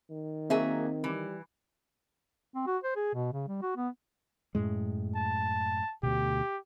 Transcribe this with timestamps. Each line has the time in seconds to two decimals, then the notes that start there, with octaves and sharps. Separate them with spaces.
0.10 D#3
0.50 F#3 A#3 C4 G#4 E5
1.04 E3 G3
2.55 C4
2.67 F#4
2.84 C5
2.96 G#4
3.14 B2
3.33 C#3
3.48 G3
3.62 F#4
3.76 B3
4.55 F#2 A2 G#3
5.15 A5
6.03 D2 B2 G4